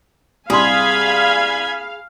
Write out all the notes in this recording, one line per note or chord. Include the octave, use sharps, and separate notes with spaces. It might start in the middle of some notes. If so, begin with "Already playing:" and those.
C2 G#4 F5 G#5 B5 C6 G#6